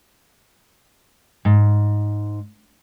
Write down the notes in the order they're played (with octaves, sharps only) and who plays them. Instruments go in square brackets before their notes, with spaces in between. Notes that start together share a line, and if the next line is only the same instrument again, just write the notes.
[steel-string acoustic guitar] G#2